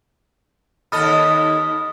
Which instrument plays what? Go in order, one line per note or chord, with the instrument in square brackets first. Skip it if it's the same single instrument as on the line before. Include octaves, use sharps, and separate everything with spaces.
[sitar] D#2 A4 D#5 [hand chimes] B5 F6 A6 [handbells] D#6